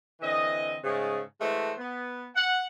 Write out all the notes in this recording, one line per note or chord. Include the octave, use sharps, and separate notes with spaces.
D3 E3 C4 D#5
G#2 C#3 G#3 A3 G#4
E3 G#3 A3 F#4 A4 C5
B3
F#5